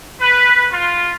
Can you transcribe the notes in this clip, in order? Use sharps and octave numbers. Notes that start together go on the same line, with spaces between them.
B4
F4